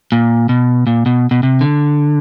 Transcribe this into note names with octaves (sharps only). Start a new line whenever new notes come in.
A#2
B2
A#2
B2
B2
C3
D3